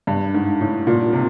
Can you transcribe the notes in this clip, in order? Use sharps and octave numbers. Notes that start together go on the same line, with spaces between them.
G2
G#2
A2
A#2
C3